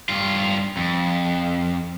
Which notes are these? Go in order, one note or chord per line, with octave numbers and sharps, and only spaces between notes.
G2 F4
F2